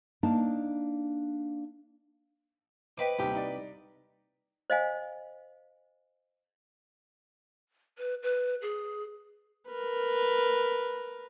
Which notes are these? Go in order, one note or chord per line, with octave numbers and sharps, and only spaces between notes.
A#3 D4 D#4 A5
B4 C5 D#5 G5 D6
D#1 C2 D#4 G4
D#4 D5
C5 D#5 F5 G#5
B4
B4
G#4
A#4 B4